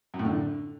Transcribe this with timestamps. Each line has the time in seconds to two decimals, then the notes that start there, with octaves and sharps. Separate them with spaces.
0.14 F#2
0.19 A2
0.25 D3